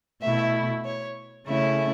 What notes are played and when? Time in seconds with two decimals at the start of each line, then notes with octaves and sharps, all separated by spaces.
0.21 B2 A3 E4 E5
0.84 C#5
1.47 C#3 A3 C#4 E4 E5